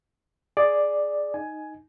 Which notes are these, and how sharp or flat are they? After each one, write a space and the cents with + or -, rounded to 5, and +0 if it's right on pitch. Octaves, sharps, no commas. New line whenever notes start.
G#4 +5 D5 +5
D#4 +0 G#5 +10